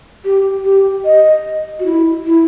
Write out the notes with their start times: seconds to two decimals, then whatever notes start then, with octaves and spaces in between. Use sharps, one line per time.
0.25 G4
0.65 G4
1.05 D#5
1.79 F#4
1.86 E4
2.26 E4